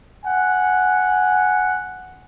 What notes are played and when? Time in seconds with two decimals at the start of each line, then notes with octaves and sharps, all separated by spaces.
0.25 F#5 G#5